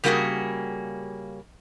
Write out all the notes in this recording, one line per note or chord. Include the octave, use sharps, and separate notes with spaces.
C#3 G3 A#3 F4 F#4 G#4